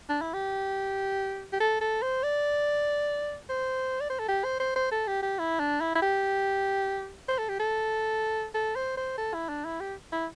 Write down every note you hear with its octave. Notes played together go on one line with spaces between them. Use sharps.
D4
E4
G4
G4
A4
A4
C5
D5
C5
D5
C5
A4
G4
C5
C5
C5
A4
G4
G4
E4
D4
E4
E4
G4
C5
A4
G4
A4
A4
C5
C5
A4
E4
D4
E4
G4
E4